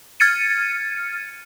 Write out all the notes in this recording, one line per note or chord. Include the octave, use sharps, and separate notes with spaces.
F6 G#6 A6 C#7 D#7